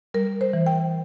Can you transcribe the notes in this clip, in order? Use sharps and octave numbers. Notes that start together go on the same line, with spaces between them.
G3 A#4
C5
E3
G5